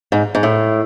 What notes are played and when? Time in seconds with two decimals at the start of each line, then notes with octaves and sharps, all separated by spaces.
0.12 G#2
0.35 G#2
0.43 A2